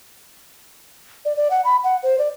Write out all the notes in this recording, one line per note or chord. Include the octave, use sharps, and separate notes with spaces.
D5
D5
F#5
B5
F#5
C5
D5